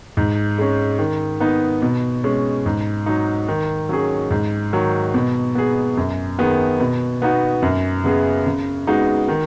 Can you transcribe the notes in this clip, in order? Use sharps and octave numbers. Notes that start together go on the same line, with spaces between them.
G#2
G#3 C#4
D#3
B3 D#4
B2
G#3 C#4
G#2
F#3 D#4
D#3
F#3 C#4 G#4
G#2
D#3 F#3
B2
B3 G#4
F#2
D#3 B3 G#4
B2
B3 D#4 F#4
F#2
C#3 B3 G#4
C#3
G#3 B3 D#4 F#4
D#3